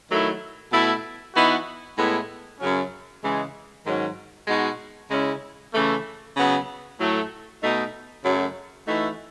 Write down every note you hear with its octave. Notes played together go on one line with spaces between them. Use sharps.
D#3 F#3 A3 E4
B2 A3 E4
E3 B3 D#4 F#4
A2 G#3 B3 E4
F#2 C#3 F#3 C#4
C#3 E3 G#3
G#2 D#3 F#3 C#4
B2 G#3 D#4 F#4
C#3 G#3 C#4 E4
C#3 E3 A3
C#3 F#3 B3 F#4
A2 F#3 A3
B2 A3 D#4
F#2 C#3 F#3 A3
E3 A3 D#4 F#4